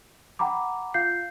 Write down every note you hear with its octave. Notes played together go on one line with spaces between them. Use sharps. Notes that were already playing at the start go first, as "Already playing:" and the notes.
F#5 G5 A#5 B5 D6
F4 F5 G6 C7